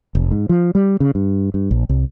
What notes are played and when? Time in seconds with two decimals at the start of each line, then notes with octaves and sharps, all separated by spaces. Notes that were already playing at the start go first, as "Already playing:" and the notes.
0.15 F1
0.32 G#2
0.49 F3
0.75 G3
1.00 C#3
1.15 G2
1.54 G2
1.71 A#1
1.89 C2